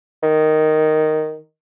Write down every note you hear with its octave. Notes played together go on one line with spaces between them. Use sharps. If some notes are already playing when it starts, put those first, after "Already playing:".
D#3